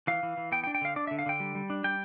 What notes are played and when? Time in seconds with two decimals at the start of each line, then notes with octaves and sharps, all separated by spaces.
0.07 E3 F5
0.23 E3
0.37 E3
0.52 B3 G5
0.64 G5
0.67 D4
0.75 G5
0.81 D3 F5
0.96 D4 D5
1.07 D3 E5
1.19 F5
1.26 D3 G5
1.40 G3
1.55 G3
1.70 D4
1.84 G3 G5